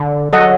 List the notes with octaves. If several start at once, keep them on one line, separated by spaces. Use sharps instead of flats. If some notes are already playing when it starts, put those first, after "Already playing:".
Already playing: D3
F#3 A4 D#5 F#5